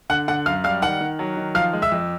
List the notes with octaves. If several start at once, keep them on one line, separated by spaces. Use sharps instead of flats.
D3 F#5 F#6
D3 F#5 F#6
F#2 F5 F6
G3 F5 F6
D#3 F#5 F#6
D#3
F#3
D#3
F3 F5 F6
G#3
E5 E6
F2